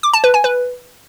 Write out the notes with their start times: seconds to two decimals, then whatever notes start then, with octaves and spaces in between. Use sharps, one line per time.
0.03 D6
0.13 A5
0.24 B4
0.34 G#5
0.44 B4